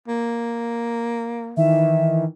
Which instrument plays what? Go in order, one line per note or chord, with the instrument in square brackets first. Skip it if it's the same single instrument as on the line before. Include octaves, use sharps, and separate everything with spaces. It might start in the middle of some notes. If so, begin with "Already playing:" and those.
[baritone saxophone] A#3
[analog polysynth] D#3 E3 [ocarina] E5